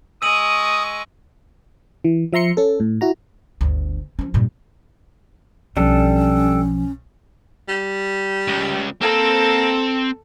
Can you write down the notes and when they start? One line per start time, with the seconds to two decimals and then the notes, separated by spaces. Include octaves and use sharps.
0.22 G#3 C#6 D#6 E6 D#7 F#7
2.04 E3
2.33 F3 E5 A#5 C6 C#7
2.57 C#4 A4
2.80 A2
3.01 E4 F#4 A#5
3.61 G1 D2
4.19 F3 C#4
4.34 G2 A#2
5.77 B1 F3 G3 C#4 D4 A4
7.69 G3
8.48 C#2
9.01 A#3 C4 A4